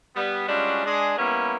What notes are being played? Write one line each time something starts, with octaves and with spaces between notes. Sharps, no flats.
G3 B3
G3 G#3 C#4 D4 F4 F#4
G#3 D4 G#4
G3 A#3 B3 C#4 E4